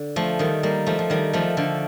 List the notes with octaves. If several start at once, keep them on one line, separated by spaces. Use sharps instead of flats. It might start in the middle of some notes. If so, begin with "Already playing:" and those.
Already playing: D3
F3 A3
D#3 G3
G3 A#3
F3 A3
F3
D#3 G3
F3 A3
D3 F3